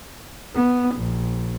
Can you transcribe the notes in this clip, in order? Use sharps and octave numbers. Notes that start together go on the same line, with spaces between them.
B3
A#1